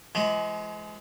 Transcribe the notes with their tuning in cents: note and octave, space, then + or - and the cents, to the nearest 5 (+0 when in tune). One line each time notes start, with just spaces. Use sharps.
F3 -45 G#3 +30